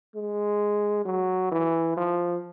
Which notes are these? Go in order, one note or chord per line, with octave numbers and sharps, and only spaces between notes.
G#3
F#3
E3
F3